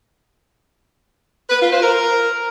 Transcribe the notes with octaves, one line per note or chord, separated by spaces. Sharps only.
B4
F4
C5
A#4